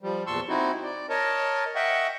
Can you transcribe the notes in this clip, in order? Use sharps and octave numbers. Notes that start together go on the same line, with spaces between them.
F3 G3
E2 A#2 A5 C6 C#6 E6
C4 D#4 E4 F#4
D5
A#4 C#5 D#5 A5
D#5 E5 F#5 G5 C#6